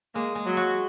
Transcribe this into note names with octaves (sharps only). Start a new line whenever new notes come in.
G#3 A#3
G#3
F#3
F#4